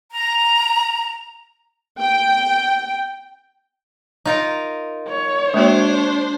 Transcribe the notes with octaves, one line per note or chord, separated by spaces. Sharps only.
A#5
G5
D#4 F4 A#4
C#5
G#3 A#3 D4 F#4 C5